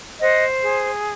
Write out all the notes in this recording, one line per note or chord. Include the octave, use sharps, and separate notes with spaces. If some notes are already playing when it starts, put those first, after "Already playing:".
C5 D#5 F#5
G#4